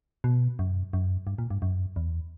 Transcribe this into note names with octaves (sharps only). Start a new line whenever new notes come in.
B2
F#2
F#2
G2
A#2
G2
F#2
E2